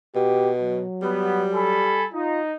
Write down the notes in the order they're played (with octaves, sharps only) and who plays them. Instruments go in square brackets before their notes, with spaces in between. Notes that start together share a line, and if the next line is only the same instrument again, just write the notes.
[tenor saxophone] B2 [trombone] G4
[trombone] F#3
[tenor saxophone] G3 [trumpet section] B3
[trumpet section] A4 G#5 B5
[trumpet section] D#4 [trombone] F4